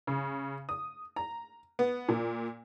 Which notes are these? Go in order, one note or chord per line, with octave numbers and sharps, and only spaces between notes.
C#3
D#6
A#5
B3
A#2